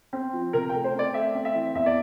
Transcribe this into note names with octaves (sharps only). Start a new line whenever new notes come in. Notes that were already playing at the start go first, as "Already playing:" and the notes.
C4
F3
C3 A#4
G5
A3
C5
C4 D5
A3 E5
C4
E5
E3
E2 E5
D5